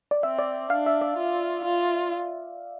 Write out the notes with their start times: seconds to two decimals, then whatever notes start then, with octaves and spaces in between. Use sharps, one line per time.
0.11 D5
0.23 C4 E5
0.39 D5
0.70 D4 F5
0.86 E5
1.01 D5
1.17 F4
1.64 F4